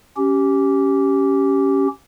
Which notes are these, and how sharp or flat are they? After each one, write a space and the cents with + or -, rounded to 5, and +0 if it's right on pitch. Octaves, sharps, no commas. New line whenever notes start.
C#4 +0 G4 -15